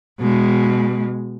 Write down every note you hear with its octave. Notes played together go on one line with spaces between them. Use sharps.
B2 G#3